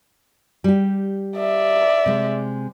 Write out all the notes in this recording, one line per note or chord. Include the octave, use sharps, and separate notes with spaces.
G3 G4
D5 E5
C3 G#3